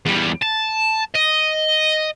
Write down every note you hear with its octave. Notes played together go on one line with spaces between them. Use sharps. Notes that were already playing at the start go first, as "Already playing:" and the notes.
E2 G3
A5
D#5